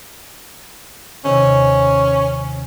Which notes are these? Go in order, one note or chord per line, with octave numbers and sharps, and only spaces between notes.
D#2 C3 D#3 C#4